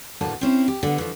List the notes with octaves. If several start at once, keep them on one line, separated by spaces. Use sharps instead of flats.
D2 A2 E3 A#3 A5
C4 C#4 E4 C5
G4
D3 B3
E3 F3